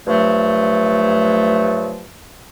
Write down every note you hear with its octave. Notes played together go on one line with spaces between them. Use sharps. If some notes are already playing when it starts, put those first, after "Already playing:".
G2 F3 F#3 A3